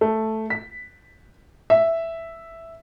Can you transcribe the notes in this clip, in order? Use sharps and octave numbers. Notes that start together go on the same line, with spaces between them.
A3
B6
E5